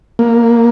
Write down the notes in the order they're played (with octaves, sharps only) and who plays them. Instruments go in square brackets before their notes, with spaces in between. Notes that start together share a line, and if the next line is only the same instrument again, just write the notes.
[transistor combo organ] A#3